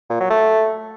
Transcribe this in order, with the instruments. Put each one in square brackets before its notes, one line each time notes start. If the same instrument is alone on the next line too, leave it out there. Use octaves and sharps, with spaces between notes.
[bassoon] A#2
F#3
A3